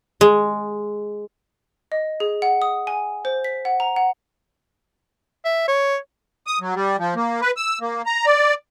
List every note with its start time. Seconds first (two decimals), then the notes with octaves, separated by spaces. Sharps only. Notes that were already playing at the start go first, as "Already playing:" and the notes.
0.21 G#3
1.92 D#5
2.20 G#4
2.42 F#5
2.62 D#6
2.87 G#5
3.25 C5
3.45 B6
3.65 F#5
3.80 A#5
3.96 F#5
5.45 E5
5.68 C#5
6.47 D#6
6.61 F#3
6.75 G3
6.99 F3
7.15 A#3
7.41 B4
7.57 E6
7.81 A#3
8.06 A#5
8.26 D5